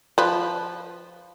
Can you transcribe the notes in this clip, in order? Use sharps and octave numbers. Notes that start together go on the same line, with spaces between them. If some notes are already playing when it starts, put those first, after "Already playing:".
F3 B4